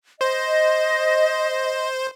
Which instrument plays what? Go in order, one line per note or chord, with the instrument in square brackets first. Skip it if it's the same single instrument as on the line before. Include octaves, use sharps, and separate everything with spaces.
[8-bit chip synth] C5 [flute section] D#5